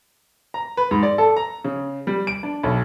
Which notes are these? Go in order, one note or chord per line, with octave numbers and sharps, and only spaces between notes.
A#5
B4
G#2
D5
A4
A#5
C#3
G3
D7
D4
B1